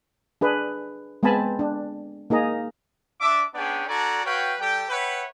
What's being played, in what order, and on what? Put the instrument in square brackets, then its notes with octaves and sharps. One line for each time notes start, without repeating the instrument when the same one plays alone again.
[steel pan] D4 G#4 B4
G#3 B3 C4 G#5 A5 B5
D4
A#3 D#4 G#4 D#5 A#5
[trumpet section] D4 E5 D6
B3 C#4 D4 G#4 D5 G5
D4 F#4 A4 D5 G#5 A#5
F#4 B4 C#5 F5 G5
G3 G4 A4 G5
B4 C#5 E5 F#5 G5 B5